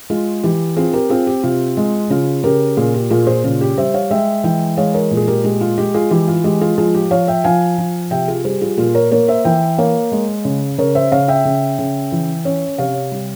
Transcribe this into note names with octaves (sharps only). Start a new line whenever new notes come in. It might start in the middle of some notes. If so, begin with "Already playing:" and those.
G#3 F4 G#4
E3 G4
C4 F4 G#4
G4 A#4
C4 F4 G#4
G4
C3 F4
G#3
C#3 F4 G#4
C#3 G4 A#4
A#2 F4 G#4
G4
A#2 F4 G#4
G#4 C5
C#3 F4
G4
G3 C5 E5
C#5 F5
G#3 E5 G5
E3 E5 G5
G#3 C#5 F5
A#4 C#5
A#2
G#4
G4 A#4
G#3 G4
F4
G#3 G4
F4 G#4
E3 G4
F4
G#3 G4
F4 G#4
F3 F4 G#4
G4
F3 C#5 F5
E5 G5
F3 F5 G#5
F3
C3 E5 G5
F4 G#4
G3 G#4 C5
F4 G#4
A#2 F4 G#4
A#4 C#5
A#3 A#4 C#5
C5 E5
E3 E5 G5
A#3 C#5 F5
G#3
C#3
C#3 A#4 C#5
C5 E5
C#3 C#5 F5
E5 G5
C#3
C#3
E3
C#4
C3 C#5 F5
G3